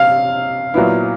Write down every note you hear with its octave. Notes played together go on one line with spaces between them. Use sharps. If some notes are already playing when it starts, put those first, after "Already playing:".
Already playing: C3 F5
A#2 F#3 B3 E4